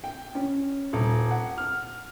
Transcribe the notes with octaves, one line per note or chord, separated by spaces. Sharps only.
G5
C#4
D#1
F#5
F6